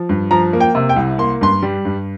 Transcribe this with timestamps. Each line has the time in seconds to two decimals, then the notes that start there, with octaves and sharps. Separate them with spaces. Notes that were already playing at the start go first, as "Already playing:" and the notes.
Already playing: F3
0.09 G2
0.31 F3 A#5
0.53 A#3
0.60 G5
0.75 C3
0.89 G5
0.96 C2
1.18 A#3 C6
1.41 G2 C6
1.63 G3
1.85 G2